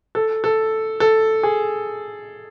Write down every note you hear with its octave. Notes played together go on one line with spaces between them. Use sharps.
A4
A4
A4
G#4